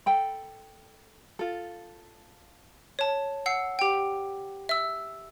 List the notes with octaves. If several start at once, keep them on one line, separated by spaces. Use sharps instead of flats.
A4 G5 B5
F4 A4
C#5 A5
F#5 E6 C7
G4 G5
E5 E6